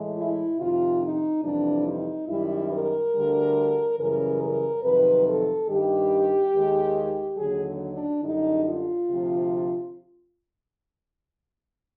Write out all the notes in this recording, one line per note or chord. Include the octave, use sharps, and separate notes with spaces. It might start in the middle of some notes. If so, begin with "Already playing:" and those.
Already playing: A2 E3 G#3
E4
F2 C3 D#3 F4
D#4
F2 C3 E3 G3 D4
D#4
F#2 D#3 G3 E4
A#4
D2 D3 G3
F#2 C#3 E3 G3 A#4
A#4
F2 C3 D#3 F#3 B4
A4
G2 D#3 G3 G4
D#2 D#3 G#3
D#2 D3 F#3 G#4
D4
F#2 D3 G3 D#4
F4
D2 C3 F3